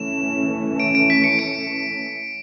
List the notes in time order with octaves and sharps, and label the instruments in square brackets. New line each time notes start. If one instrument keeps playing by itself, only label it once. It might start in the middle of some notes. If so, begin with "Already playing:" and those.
Already playing: [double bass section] E3 A3 C#4 [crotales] E7
[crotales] D7
D7
B6
C#7
D7